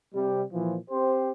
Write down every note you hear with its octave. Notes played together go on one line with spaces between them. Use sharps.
C3 G3
A#2 E3 F3
C4 G4 C5